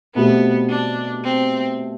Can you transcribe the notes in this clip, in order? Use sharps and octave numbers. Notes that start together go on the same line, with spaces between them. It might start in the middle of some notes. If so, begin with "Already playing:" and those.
B2 A3 B3 C4 G4
D4
C4